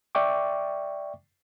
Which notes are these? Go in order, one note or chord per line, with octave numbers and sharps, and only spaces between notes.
D5 E5 G5 C#6 D6